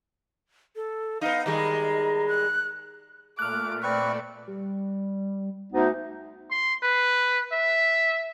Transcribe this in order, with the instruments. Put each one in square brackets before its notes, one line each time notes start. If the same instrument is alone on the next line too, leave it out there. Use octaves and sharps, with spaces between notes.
[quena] A4
[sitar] B3 D#4 [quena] F5
[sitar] D#3 G3 G#3 [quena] A#5
[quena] F#6
[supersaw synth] A#2 A3 [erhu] D6 [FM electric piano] F6 F#6
[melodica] C4 B4 C#6 [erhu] D5
[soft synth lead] G3
[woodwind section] D2 B3 D#4
[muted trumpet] C6
B4
E5